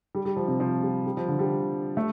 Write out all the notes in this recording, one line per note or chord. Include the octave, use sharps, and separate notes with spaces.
G3
G3
F3
C3
F3
G3
G3
F3
D3
G3
A3